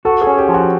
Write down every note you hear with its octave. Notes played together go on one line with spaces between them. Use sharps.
F#4 A4
G#4
C#4
G4
F3
F#4